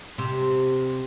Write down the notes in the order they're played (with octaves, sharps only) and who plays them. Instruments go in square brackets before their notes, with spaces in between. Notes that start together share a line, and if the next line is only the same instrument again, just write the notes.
[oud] C3